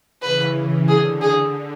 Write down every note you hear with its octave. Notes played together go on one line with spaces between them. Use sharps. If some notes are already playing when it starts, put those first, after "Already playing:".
C#3 E3 B4
D3 G#4
G#4